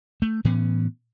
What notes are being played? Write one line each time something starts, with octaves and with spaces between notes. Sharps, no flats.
A3
A2 E3 B3 C#4